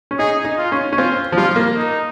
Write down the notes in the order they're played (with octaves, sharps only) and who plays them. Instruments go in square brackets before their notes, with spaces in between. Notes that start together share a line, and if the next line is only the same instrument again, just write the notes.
[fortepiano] C#4
[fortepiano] D#4 [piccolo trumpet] G#4
[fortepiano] D#4
[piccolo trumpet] F4
[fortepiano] C#4
C#4
[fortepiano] C4 [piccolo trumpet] F4
[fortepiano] F3
[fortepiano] G3 [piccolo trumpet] F4
[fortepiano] A#3
[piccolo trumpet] D#4